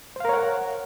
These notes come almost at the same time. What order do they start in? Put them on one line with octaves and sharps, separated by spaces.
C5 F5 A#4 C#5 F#5